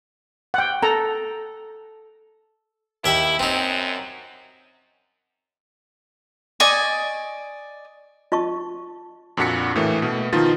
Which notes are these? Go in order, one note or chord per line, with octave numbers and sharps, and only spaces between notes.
F#5 G5
A4 A#5
D#2 E4 E5 G5
F#2 C4 D#4
D5 D#5 G#5 C#6
F4 D#5 A5 C#6
F2 A#2 D4 F#4 B6 C#7
A2 E3 A3 A#3
B2 A3
B2 D#3 F3 D#4 F4 A6